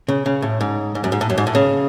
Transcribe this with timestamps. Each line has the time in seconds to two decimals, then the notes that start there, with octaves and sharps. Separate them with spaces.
0.08 C#3
0.26 C#3
0.42 A2
0.61 G#2
0.95 G#2
1.04 F#2
1.12 G#2
1.21 A2
1.30 F#2
1.38 G#2
1.47 A2
1.55 C#3